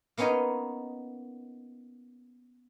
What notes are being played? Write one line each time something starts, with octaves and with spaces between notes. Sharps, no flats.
A#3 B3 C#4 D#4 C#5 D#5